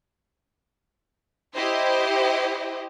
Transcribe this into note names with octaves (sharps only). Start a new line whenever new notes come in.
E4 G4 C5 D#5